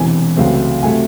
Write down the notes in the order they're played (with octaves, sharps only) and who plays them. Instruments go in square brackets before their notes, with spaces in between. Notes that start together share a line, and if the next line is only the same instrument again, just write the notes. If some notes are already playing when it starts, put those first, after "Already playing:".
Already playing: [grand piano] E1 E2 C3 E3 G#5
C#2 C3 F#3 A3 C4
C3 F#3 A3 G#5